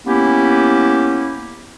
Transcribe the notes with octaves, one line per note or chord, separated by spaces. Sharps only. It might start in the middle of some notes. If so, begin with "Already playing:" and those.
A#3 B3 C#4 E4 G4